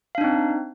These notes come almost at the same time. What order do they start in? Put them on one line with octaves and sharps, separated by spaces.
F5 D4 D#4 C4